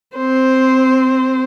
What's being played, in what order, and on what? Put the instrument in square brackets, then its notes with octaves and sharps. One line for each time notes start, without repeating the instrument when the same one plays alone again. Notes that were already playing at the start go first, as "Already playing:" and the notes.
[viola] C4 C5